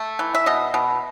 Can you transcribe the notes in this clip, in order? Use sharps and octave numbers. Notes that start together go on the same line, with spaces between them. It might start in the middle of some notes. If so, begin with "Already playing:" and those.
Already playing: A3
E3
E5
B2 D#5
B2